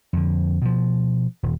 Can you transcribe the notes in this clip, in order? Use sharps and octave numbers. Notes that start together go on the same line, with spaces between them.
F2 D3
B2 F3
D#1